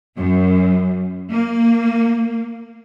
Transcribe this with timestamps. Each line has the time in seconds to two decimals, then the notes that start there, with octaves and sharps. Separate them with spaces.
0.18 F#2
1.32 A#3